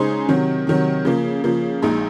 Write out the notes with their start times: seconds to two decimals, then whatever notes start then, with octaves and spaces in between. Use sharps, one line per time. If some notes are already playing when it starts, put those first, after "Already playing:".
Already playing: C#3 G#3 D#4 G#4 C5
0.29 C3 D#3 F#3
0.67 C3 D#3 F#3
1.05 C#3 F3 A#3
1.44 C#3 F3 A#3
1.82 A#1 A#2 G#3 D#4